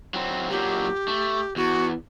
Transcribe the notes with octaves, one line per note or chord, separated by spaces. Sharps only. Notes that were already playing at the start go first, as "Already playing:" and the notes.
F#3 C4
A#2 F#3 G4
A3
E2 F#4